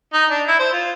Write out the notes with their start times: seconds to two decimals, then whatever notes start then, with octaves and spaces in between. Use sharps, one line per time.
0.13 D#4
0.30 D4
0.48 E4
0.59 C5
0.73 F4